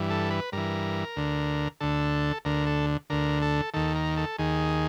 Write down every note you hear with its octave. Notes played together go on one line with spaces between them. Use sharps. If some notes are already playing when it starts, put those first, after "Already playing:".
Already playing: G2 E3
A4
B4
G2 E3 A#4
D2 D3
D2 D3 A4
D2 D3 A#4
A4
D2 D3 A#4
A4
D#2 D#3 A4
A#4
A4
D#2 D#3 G#4